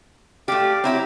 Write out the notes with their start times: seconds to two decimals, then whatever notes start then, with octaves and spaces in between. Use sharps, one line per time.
0.48 A3 G4 D5 F5 D6
0.84 F#3 C4 E4 G4 A#5